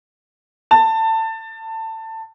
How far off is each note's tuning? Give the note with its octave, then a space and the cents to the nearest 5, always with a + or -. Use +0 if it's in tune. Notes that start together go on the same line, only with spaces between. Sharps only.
A5 +20